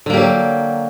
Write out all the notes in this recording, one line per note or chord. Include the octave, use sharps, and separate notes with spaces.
D3 F#3 A#3 G4